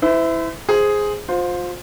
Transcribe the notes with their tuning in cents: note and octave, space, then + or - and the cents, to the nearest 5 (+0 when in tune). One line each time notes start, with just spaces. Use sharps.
E4 -5 C5 -45
G#4 +0 C5 +0
F4 +30 C5 +0